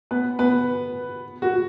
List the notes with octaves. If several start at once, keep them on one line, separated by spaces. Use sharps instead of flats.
B3 B4
B3 B4
F#4